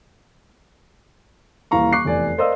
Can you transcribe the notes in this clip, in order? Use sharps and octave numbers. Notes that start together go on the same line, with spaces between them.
D#1 E3 F5 A#5 C#6
C#6 D6 F#6 C7
F1 E2 D5 G#5
A#4 C5 D5 D#5 F5 E6